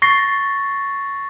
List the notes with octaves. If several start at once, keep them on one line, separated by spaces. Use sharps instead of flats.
C#6 A6 A#6 C7